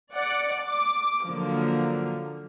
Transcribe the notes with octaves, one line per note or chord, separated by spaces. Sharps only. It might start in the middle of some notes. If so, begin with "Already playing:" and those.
D5 F#5
D6
D3 F3 F#3 A#3